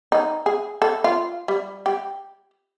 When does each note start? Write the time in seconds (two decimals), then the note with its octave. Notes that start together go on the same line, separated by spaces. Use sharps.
0.12 D#4
0.46 G#4
0.82 A4
1.04 F4
1.48 G3
1.86 G4